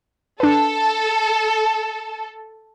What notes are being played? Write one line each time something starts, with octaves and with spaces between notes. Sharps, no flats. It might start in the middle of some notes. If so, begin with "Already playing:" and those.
D4 A4 B4